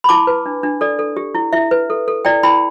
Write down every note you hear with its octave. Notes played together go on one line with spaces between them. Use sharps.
B5
E4 A5 D6
B4
D4
D4
A4 D5
A4
G4
E4
E4 E5
B4
A4
A4
E4 D5 G5
E4 G5 B5